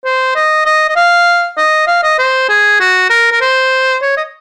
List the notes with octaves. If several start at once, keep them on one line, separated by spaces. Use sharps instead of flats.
C5
D#5
D#5
D#5
F5
D#5
F5
D#5
C5
G#4
F#4
A#4
A#4
C5
C#5
D#5